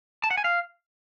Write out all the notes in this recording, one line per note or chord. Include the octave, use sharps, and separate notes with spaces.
A5
F#5
G#5
F5